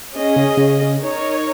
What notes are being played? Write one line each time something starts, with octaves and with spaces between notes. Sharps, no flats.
C#4 G#4 D#5
C#3
C#3
D#4 A#4 C#5